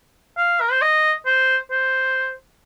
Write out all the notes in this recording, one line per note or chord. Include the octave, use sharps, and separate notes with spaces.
F5
A#4
C5
D#5
C5
C5